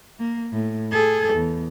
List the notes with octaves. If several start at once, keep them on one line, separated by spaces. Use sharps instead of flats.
A#3
A2
G#4 A4
E2